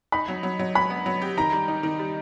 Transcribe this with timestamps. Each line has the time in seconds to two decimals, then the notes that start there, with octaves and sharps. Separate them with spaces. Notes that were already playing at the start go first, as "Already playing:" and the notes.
0.12 D#4 B5
0.28 F#3
0.43 F#3
0.59 F#3
0.75 F#3 B5
0.90 B3
1.06 F#3
1.22 G4
1.37 D#3 A#5
1.53 G3
1.68 D#4
1.83 D#3
1.99 G3